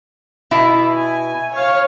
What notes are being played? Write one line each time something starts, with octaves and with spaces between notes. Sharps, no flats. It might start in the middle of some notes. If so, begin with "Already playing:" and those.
B2 E4
G#5
C#5 F5